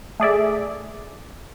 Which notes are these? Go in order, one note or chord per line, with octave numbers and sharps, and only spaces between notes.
A3 G#4 D5 E5